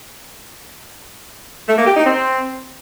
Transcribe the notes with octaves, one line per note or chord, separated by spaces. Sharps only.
A3
A#3
G4
D#4
C4